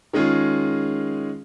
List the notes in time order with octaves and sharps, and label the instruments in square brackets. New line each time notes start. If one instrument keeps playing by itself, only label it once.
[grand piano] D#3 G#3 C#4 F4 G#4